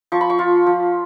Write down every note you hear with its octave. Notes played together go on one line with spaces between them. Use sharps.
F3 C#6
B5
C#6
F4
F3